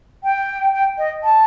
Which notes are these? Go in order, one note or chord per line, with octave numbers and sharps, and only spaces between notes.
G5
G5
D#5
A5